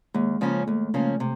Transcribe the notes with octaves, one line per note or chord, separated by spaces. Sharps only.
D#2 G#3
C#3 F3 A#3 C#4
D#2 A3
C#3 F3 A#3 C#4
C3